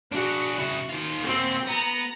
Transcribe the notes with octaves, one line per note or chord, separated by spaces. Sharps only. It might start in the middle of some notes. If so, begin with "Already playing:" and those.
D4 F#4 G#4
C#3 E4
D#3 F4
A#3 C4 F#4
B3 A#5